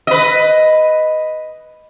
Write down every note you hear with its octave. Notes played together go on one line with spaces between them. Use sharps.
B4 D#5